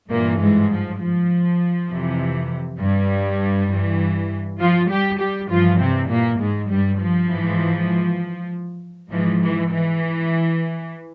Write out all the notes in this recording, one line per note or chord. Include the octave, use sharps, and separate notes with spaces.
G2 A#2 E3 A#3
G#2 G#3
F3
F3
F2 C3 E3
G2 G3
G2 E3
F3 F4
G3 G4
G3 G4
G2 E3 F3 F4
C3 C4
A#2 A#3
G#2 G#3
G2 G3
F3
G#2 E3
G#2 E3 F3
E3
E3